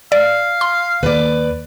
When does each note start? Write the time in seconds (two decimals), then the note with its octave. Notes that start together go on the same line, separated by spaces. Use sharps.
0.12 D5 F5
0.61 C6
1.03 D#2 B4 D5